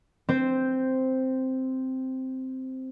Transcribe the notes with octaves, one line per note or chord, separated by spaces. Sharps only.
C4 C5